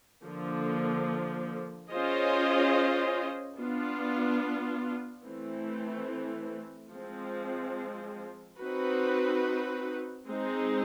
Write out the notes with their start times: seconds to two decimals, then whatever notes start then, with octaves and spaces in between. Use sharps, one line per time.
0.23 D3 F3 A#3
1.90 C#4 F4 G#4 C5 D#5
3.57 B3 D4 F4
5.24 E3 A3 C4
6.91 F3 G#3 C4
8.59 C4 D#4 F#4 B4
10.26 G#3 C4 D#4